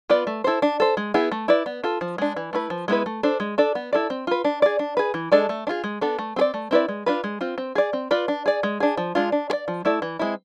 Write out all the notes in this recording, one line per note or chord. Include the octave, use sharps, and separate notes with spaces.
B3 F4 B4 D5
A3
E4 A4 C5
D4
A4 C5
G#3
B3 E4 G#4
A3
E4 B4 D5
B3
F4 A4
F3
G#3 D4
E3
A3 E4 B4
F3
G#3 B3 E4 B4
A3
D4 A4 C5
G#3
D4 A4 D5
B3
E4 A4 D5
C4
F4 B4
D4
G#4 D5
D4
G#4 B4
E3
G#3 D4 A4 D5
A3
D4 F4 G#4
G#3
B3 D4 A4
A3
C4 G#4 D5
A3
C4 E4 B4 D5
G#3
D4 F4 B4
G#3
C4 F4
C4
G#4 D5
C4
F4 B4 D5
D4
G#4 D5
G#3
D4 G#4
F3
G#3 D4 F4
D4
G#4
D5
F3
A3 E4 A4 D5
E3
G#3 C4 E4